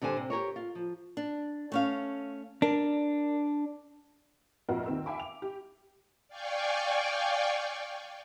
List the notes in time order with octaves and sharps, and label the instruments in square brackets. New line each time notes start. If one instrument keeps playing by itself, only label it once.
[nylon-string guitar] G2 D3 G4 C5 G#5
C3
G4 G#4 A#4 C#5
F4
F3
D4
A3 C#4 F5
[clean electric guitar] D4 [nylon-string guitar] A#4
[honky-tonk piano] A#1 F2 F4 F#4 A#4
D#2 D#3 C4 A#4 E6
E5 F5 G5 G#5 B5 D6
F7
G4
[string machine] D5 F5 G5 G#5 C#6